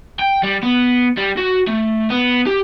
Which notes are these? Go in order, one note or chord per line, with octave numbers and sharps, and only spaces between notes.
G5
G3
B3
G3
F#4
A3
B3
G4